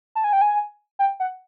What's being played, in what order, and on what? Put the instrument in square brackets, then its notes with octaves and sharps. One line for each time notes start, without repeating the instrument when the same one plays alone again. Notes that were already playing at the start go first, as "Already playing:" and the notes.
[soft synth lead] A5
G#5
G5
G#5
G5
F#5